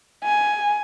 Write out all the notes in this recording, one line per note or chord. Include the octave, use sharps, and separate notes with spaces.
G#5